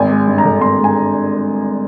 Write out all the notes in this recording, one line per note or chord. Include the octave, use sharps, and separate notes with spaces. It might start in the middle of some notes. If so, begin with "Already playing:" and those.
Already playing: G#1 G#5
G#3
G2
A#5
D3
G#1 C6
G#3
G#5